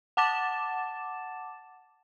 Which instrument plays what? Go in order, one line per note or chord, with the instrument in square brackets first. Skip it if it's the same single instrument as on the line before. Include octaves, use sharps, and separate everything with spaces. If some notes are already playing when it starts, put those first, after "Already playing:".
[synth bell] F#5 A5 D6 A6 E7